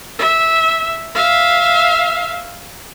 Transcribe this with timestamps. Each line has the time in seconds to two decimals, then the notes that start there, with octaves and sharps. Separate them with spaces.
0.19 E5
1.15 E5 F5